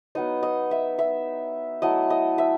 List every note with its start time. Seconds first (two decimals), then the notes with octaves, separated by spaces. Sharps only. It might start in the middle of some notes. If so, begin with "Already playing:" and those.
0.15 F#3 B3 D#4 D#5
0.43 D#5
0.71 E5
0.99 E5
1.82 F#3 A3 E4 D#5
2.10 D#5
2.38 E5